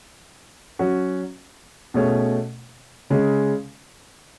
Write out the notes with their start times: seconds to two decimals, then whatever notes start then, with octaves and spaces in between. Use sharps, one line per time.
0.79 F#3 C#4 F#4
1.94 B2 A3 C#4 G#4 C#5
3.10 C#3 G#3 C#4